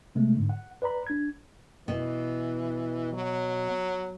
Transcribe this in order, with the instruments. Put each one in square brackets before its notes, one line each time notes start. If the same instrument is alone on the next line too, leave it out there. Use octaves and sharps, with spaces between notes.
[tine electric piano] C3 G#3 A3 B3
G#2 D3
F#5
B4 D5 A#5 B5
D4 G#6
[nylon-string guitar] B2 [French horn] E3
[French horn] F#3